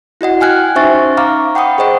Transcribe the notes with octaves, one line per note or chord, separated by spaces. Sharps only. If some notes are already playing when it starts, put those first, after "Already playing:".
E4 F#4 D#5 F#5
G5 G#5 F6 F#6 G#6
C#4 D#4 C5 E5 C#6 A6
F5 A#5 C#6 D6 F6
F#5 G5 B5 C#6 D#6
G#4 C5 D#5 F#5